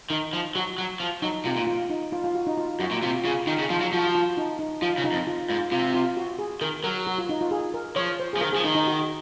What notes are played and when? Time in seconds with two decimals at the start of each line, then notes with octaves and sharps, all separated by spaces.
0.10 D#3 D#4
0.33 F3
0.55 F#3 F#4
0.78 F#3
1.00 F3
1.22 F#3 D#4
1.45 C3 F4
1.56 A#2
1.67 F4
1.90 D#4
2.13 F4
2.24 F4
2.35 F#4
2.47 D#4
2.58 F4
2.80 F#2 F#4
2.91 A#2
3.02 C3 F4
3.24 C#3 F4
3.47 D#3 D#4
3.59 C#3
3.70 F3 F4
3.81 F#3
3.92 F3 F#4
4.15 F4
4.37 D#4
4.59 D#4
4.82 F3 F4
4.98 C#3
5.04 D#4
5.12 F2
5.27 F4
5.49 G#2 F4
5.72 C3 F4
5.94 F4
6.17 F#4
6.39 G#4
6.61 D#3 A#4
6.84 F#3 A#4
7.07 F#4
7.18 F4
7.29 D#4
7.41 F4
7.51 G#4
7.74 A#4
7.96 F3 C#5
8.20 C5
8.33 G#4
8.37 F3
8.41 D#3 A#4
8.53 F3 G#4
8.64 D#3 D#4
8.75 D#4
8.87 F#4